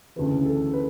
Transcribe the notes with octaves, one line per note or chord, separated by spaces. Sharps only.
D2 C#3 E3 B4
A4
B4